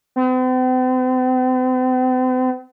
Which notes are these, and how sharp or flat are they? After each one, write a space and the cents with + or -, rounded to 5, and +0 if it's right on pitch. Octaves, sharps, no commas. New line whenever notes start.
C4 -45